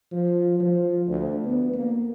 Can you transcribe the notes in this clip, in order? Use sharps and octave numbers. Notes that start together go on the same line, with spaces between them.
F3
F3
D2
B3
A#3